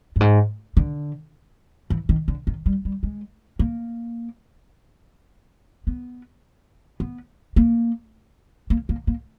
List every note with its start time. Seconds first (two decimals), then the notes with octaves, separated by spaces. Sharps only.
0.16 G2
0.21 G#2
0.77 D3
1.90 E3
2.09 D#3
2.28 D3
2.47 D#3
2.66 G3
2.85 G3
3.03 G#3
3.59 A#3
5.87 B3
7.00 B3
7.56 A#3
8.70 A#3
8.89 A#3
9.07 A#3